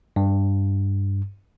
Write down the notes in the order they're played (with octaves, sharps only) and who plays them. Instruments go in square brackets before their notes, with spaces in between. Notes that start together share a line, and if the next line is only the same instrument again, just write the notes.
[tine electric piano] G2